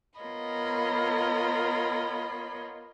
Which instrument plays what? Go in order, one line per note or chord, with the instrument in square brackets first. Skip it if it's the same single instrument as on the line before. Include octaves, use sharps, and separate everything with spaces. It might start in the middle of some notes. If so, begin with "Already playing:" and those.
[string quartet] B3 F4 A#4 C#5 D#5 B5